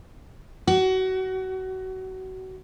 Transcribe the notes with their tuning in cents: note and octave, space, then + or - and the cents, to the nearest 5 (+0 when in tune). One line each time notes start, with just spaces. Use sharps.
F#4 +25